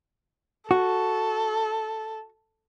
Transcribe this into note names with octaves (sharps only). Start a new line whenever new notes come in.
F#4 A4